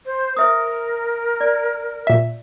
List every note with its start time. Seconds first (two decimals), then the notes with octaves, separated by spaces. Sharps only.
0.06 C5
0.37 A#4 C5 E5 D#6
1.40 D5
2.07 A#2 E5